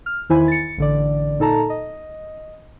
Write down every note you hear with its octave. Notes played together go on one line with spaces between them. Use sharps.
F6
E2 D#3 E4 C5 G#5 B5
A6 C#7
A1 D3 D5
A#2 D#4 A4 A5 A#5
D#5